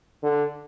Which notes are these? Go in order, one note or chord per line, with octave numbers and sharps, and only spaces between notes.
D3